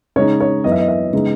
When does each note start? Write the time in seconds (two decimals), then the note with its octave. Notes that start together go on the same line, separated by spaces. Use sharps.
0.16 C#3 G#3 D#4 C#5
0.40 C#5
0.64 F#2 E3 B3 E4 D#5
0.72 E5
0.79 D#5
0.88 E5
1.13 C#3 G#3 B3 D#4